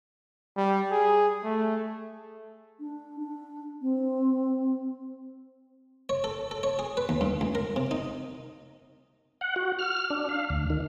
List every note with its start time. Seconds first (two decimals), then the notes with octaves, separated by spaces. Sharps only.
0.57 G3
0.91 G#4
1.44 A3
2.79 D4
3.19 D4
3.81 C4
6.09 C#5
6.24 A4
6.51 A4
6.63 C#5
6.79 G#4
6.97 B4
7.09 D#2
7.21 G2
7.41 C#2
7.55 A#4
7.76 C3
7.91 D#4
9.41 F#5
9.56 F#4
9.79 F6
10.10 D4
10.29 F5
10.50 D2
10.70 D#3